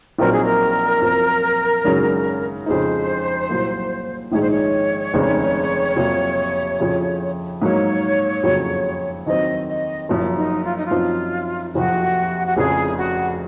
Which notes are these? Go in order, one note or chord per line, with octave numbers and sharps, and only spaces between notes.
A#1 A#2 F#3 C4 D#4 A#4
G#4
A#4
F#1 F#2 F3 C4
G#1 F#2 C#3 F#3 C#4
F2 C#3 G#3 D#4 C5
C2 A#2 F#3 A#3
A#1 G#2 D#3 G#3 C#5
C5
C#5
F1 D#2 C#3 G#3 C4
F2 C3 F#3 A#3
F2 C#3 F3
G#2 F#3 A#3 C#5
F#1 F2 C#3 F#3 A#3
D#2 D#3 F#3 C4 D#5
D#5
F#1 F#2 F3
D#4
F4
D#4
F4
F#2 F3 C4 D#4
F#1 F2 C3 F3 F#4
F#4
F1 F2 C#3 G#4
F#4